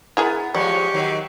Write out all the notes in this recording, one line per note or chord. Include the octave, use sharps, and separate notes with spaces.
B3 E4 G#4 A#4
F3 G#3 C#4 G4 D5 C#6
D#3 F#3 C4